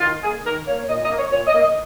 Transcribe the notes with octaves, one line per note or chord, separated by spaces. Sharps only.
D#3 F4
A#3 G#4
D#3 A#4
A#3 C#5
A#2 D#5
D#5
A#3
C#5
A#2 C#5
D#5
A#3
D#5